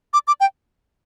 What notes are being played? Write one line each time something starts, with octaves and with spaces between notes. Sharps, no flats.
D6
D6
G5